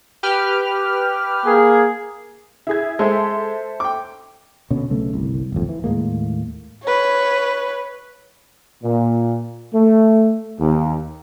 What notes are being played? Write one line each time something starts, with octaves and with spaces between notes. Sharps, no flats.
G4 B4 F6
A#3 G#4
E4 G#4 G#6
G#3 A4 C5 E5
G5 D6
B2 D3 C#4
B1 C#3 A3 B3
G1 C2
D1 G#1 F2
E3
D#2 A2 G#3 A#3
B4 C#5
A#2
A3
D#2